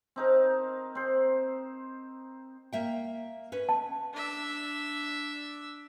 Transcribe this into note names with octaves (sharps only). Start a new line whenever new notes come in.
C4 D#4 A#4
C4 C5
A#3 E5 G5
C#4 B4
A5
D4 E5